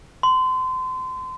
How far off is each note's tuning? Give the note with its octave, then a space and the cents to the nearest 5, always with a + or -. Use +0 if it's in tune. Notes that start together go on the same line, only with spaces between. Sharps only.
C6 -30